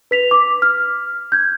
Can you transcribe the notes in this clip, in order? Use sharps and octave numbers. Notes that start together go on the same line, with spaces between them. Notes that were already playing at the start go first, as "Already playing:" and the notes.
B4 B6 F7
D6
F6
G6 G#6